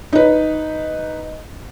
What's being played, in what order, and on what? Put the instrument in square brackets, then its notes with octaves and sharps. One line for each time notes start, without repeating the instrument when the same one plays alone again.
[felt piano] D#4 B4